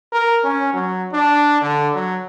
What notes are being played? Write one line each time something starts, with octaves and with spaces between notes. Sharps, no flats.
A#4
C#4
F#3
D4
D3
F#3